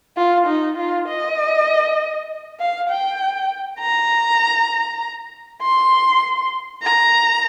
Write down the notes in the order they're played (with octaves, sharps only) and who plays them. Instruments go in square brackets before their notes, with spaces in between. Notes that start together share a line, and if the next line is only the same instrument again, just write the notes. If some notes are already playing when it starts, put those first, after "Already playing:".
[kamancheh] F4
D#4
F4
D#5
F5
G5
A#5
C6
A#5